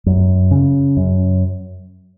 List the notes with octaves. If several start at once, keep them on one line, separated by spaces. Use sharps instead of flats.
F#2
C#3
F#2